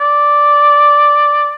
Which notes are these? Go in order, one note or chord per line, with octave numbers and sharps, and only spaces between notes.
D5